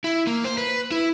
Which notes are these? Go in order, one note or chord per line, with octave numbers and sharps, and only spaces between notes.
E4
A#3
C5
B4
E4